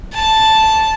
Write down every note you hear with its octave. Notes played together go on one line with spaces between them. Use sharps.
A5